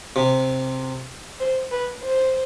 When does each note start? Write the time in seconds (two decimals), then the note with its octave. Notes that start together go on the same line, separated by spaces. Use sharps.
0.16 C3
1.40 C5
1.71 B4
2.03 C5